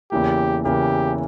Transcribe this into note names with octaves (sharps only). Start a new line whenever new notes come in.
E2 C#3 E3 A#3 G4
E2 C#3 E3 A#3 G4